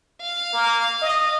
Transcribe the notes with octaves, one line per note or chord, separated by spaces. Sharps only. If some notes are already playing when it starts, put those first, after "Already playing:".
F5
A#3
D#5